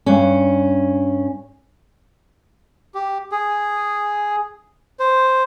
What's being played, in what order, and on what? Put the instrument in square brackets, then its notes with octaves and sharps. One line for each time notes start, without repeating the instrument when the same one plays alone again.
[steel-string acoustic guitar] G2 C#4
[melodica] G4
G#4
C5